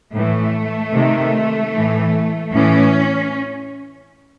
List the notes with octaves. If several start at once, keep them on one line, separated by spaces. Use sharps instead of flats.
A2 E3 A3
C3 D#3
A2 E3
A2 E3 C#4